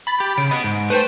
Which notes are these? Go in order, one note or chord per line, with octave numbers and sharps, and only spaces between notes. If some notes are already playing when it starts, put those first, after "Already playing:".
B5 A6
G4
C#3 D7
B3 D#5
G#2
A3 B4 C5 G5